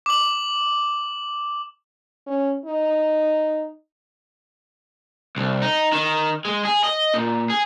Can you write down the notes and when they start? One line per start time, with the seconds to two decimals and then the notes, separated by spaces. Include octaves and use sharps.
0.06 D6 F#7
2.27 C#4
2.66 D#4
5.37 C2
5.62 D#4
5.93 D#3
6.45 G#3
6.65 G#4
6.84 D#5
7.14 A#2
7.50 G#4